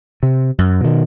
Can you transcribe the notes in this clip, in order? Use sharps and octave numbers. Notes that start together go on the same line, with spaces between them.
C3
F#2
B2 D#3